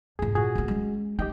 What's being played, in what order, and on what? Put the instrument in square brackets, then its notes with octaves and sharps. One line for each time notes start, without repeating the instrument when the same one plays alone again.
[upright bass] F2 G#2 [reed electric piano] G#4
[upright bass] A#2 [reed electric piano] F#4 G#4
[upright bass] D#3 A#3
G#3 C#4
[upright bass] D#4 [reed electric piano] G4 D#5 G5